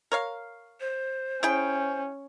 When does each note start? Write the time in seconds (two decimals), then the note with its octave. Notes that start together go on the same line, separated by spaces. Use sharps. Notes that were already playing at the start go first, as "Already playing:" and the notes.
0.12 A#4 C#5 F5
0.80 C5
1.43 C#4 E4 G#4 G5